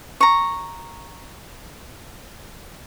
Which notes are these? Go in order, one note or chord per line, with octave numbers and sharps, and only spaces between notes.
A#5 C#6